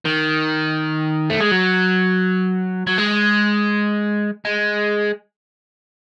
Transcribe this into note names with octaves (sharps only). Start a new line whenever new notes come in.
D#3
A3
G#3
F#3
F#3
G#3
G#3